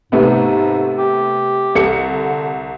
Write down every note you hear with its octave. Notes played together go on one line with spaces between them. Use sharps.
G#2 C3 A3 B3
G4
C2 A4 C#7
D3